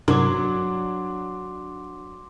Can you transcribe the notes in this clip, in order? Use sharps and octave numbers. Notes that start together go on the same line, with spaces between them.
G2 C3 F#3 D4 A#4 C6 D6